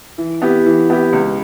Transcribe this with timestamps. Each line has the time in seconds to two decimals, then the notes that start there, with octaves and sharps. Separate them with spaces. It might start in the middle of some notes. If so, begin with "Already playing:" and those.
0.18 E3
0.42 B3 E4 G4
0.66 E3
0.90 B3 E4 G4
1.13 C#2